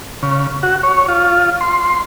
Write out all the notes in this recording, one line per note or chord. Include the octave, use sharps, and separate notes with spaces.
C#3
F#4
C#5
F4
C6